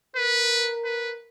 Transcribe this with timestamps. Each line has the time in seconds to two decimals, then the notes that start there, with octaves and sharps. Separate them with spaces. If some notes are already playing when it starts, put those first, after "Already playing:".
0.16 A#4 B4
0.85 B4